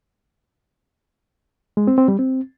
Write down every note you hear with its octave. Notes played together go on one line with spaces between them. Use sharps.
G#3
C4
C4
G3
C4